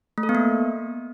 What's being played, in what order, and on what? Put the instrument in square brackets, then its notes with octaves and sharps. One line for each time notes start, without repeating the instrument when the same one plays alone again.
[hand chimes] A3
A4
B3
A#3